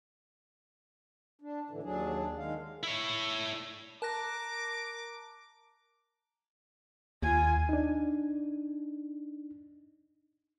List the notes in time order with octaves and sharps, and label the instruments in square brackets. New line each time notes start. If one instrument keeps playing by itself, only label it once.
[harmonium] D4
A2 D3 E3
D#2 F#3 D4 G#4
D#3 G#3 F5
[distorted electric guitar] E4 C#5
[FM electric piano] A#4 [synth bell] A5 F#6 A#6 [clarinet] A#5 [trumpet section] D6
[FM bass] D#2 [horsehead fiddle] F4 G#5
[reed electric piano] D4 D#4